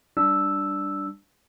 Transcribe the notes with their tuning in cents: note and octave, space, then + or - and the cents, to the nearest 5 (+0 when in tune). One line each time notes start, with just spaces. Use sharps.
G3 +0 D4 +0 E6 +0